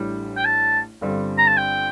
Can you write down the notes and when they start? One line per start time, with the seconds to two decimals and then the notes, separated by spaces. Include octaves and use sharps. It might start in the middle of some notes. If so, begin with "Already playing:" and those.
Already playing: A1 A2 G3 D4
0.37 G5
0.45 A5
1.01 G1 G2 D3 G3 C4
1.38 A#5
1.47 A5
1.57 G5